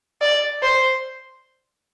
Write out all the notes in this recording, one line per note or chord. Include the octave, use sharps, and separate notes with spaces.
D5
C5